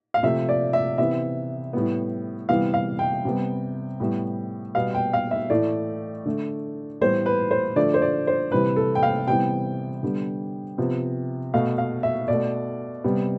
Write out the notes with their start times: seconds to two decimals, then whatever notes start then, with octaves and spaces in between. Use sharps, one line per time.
0.14 F5
0.23 C3 F3 A3 E5
0.49 D5
0.73 E5
0.98 C3 E3 B3 E5
1.73 A2 G3 B3
2.49 C3 E3 G3 B3 F5
2.74 F5
2.99 G5
3.25 C3 G3 B3
4.00 A2 G3 B3
4.75 B2 G3 B3 F5
4.94 G5
5.13 F5
5.31 E5
5.50 A2 E3 A3 D5
6.25 D3 A3
7.01 A2 E3 G3 B3 C5
7.26 B4
7.51 C5
7.76 D3 F3 A3 D5
7.94 C5
8.02 D5
8.27 C5
8.51 C3 E3 G3 B4
8.76 A4
8.95 G5
9.03 F5
9.27 C3 E3 G3 B3 G5
10.03 D3 G3 B3
10.78 C3 F3 B3
11.54 B2 A3 F5
11.78 F5
12.03 E5
12.28 B2 A3 D5
13.04 C3 G3 B3